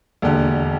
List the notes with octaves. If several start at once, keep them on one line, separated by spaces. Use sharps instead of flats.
E1 D#2 D3